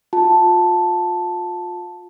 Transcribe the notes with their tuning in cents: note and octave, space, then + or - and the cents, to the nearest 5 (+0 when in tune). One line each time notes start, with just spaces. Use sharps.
F4 +30 A5 +0